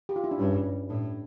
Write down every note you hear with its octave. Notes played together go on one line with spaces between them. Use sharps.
G4
F4
E4
D4
G2 C#4
A2 D4